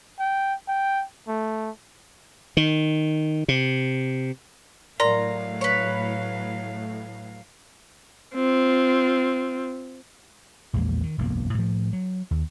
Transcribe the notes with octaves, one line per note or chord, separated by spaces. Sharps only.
G5
G5
A3
D#3
C3
A2 F#3 A#4 D5 F5 A#5 C6
B4 C#5
C4 F4
A#1 E2 G#3 A#3
D#3
E1 B1 F#2 A#3
A2 F3
F#3
D#2